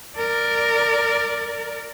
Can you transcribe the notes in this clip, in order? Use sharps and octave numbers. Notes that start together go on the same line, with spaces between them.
A#4 D5